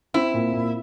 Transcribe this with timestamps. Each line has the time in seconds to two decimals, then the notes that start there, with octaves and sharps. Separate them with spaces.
0.14 C4 E4
0.34 A#2
0.53 A#2